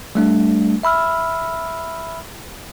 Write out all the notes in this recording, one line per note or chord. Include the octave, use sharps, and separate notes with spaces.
G3 A3 D4
E5 B5 E6 F6